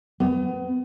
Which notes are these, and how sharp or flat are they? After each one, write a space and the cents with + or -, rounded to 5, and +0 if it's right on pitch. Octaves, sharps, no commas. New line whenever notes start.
B3 +35